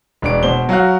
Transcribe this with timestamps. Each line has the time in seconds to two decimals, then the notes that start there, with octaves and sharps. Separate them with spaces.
0.22 E1 D4 D7
0.43 B2 C5 G7
0.69 F#3 F#4 F5 F#6